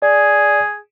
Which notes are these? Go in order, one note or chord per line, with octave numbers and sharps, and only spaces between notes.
G#4 D5